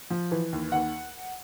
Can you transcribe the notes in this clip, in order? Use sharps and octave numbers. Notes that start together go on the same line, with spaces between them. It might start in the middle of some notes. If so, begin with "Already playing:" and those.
F3
E3
D#2
D#2 F#5